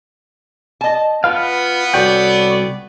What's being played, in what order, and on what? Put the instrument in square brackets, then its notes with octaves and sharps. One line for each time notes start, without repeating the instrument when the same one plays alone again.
[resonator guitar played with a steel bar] D#5 A5
[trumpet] B3 [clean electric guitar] F4 B4 F5
[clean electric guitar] C2 F#4 G5 [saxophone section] A4 C#5 D5